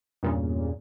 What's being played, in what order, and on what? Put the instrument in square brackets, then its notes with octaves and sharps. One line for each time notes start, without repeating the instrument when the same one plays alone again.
[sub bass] E2 [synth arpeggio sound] G2 A#2 C#3